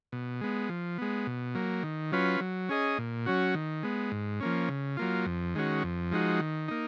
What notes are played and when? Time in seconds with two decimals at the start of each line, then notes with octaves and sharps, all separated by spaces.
0.12 B2
0.41 G#3 B3
0.69 F3
0.98 G#3 B3
1.27 B2
1.55 F#3 A#3
1.83 D#3
2.12 F#3 C#4 F4 B4
2.41 F#3
2.69 C#4 G#4 D#5
2.98 A#2
3.26 F#3 C#4 F#4
3.55 D#3
3.83 G#3 B3
4.12 G#2
4.40 F3 A#3 C#4
4.69 C#3
4.97 F#3 A#3 F4
5.26 F2
5.55 D#3 G#3 C#4 F#4
5.84 F2
6.12 F3 G#3 D#4 F#4
6.40 D#3
6.68 A#3 D#4